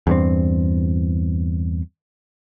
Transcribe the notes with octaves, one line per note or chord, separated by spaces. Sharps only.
E2 G2 C4